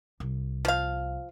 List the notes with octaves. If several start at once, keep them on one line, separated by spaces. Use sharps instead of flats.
C2
F3 F5